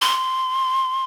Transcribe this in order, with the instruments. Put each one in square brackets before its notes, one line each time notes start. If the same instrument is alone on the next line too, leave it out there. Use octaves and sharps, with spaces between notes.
[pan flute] C6